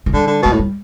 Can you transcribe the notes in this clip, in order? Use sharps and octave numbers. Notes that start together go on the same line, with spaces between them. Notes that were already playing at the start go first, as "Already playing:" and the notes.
E3
D3 G3
D3
B2
A3
A2
G3